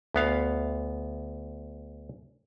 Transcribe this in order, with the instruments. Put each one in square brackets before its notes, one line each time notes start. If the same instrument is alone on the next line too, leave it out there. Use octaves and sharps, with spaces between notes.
[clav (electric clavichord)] D2 B3 F5